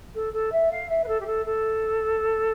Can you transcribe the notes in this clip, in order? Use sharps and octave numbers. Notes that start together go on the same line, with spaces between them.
A4
A4
E5
F5
E5
B4
A4
G4
A4
A4